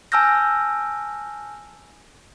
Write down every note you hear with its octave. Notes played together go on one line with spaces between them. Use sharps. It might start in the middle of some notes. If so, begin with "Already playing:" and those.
G#5 A5 E6 F6 G6 A#6